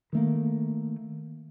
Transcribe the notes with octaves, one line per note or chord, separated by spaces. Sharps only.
D#3 A3 A#3